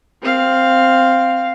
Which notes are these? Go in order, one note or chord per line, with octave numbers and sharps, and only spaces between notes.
C4 F5